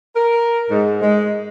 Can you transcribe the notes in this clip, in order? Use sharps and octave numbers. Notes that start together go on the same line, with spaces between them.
A#4
G#2
G#3